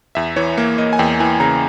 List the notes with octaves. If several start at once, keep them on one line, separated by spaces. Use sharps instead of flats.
E2 E5
E3 C#5
A#3
A#3 D#5
G#5
E2 G5
E3 G#5
C#3 A#5